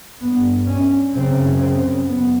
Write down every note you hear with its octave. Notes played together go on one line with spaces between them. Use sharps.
G2 B3
C#4
F#2 C#3 C4
C4
F#2 B3